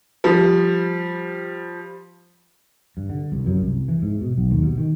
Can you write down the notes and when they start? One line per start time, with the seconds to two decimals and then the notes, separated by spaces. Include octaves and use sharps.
0.24 F3 G3
2.97 G2
3.10 D3
3.32 C2
3.46 F#2
3.62 C2
3.89 E3
4.02 G#2
4.21 B2
4.38 B1
4.51 D#2
4.63 B2
4.78 D#3